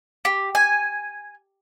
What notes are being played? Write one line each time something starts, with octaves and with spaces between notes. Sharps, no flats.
G4
G#5